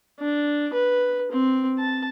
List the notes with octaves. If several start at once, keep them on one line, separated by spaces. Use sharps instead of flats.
D4
B4
C4
A5